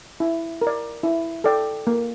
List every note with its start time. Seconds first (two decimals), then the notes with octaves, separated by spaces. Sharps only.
0.20 E4
0.62 A#4
0.67 D5
1.03 E4
1.44 A4 D5 G5
1.87 A#3